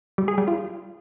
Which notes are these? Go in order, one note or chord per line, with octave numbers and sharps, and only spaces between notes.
G3
G#4
G3
F4